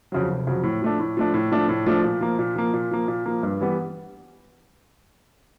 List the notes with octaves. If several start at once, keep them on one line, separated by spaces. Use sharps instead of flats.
F2 C#3 F#3
F1
F2 C#3 F#3
A2
F3 A3 D4
A2
F3 A3 D4
A2
F3 A3 D4
A2
F3 A3 D4
A#2
F3 A#3
A#2
F3 A#3
A#2
F3 A#3
A#2
F3 A#3
G2
E3 G3 B3